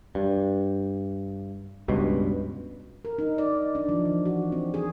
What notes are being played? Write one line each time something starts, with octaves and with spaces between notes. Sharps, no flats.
G2
C#2 G2 B2
A#4
D#4
D5
D4
F3
E3
F#4
C4
G#4